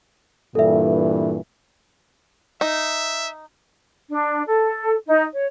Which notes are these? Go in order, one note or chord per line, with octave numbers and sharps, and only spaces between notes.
G2 A#2 E3 A4 E5
D#4 E5
D4
A4
D#4
C#5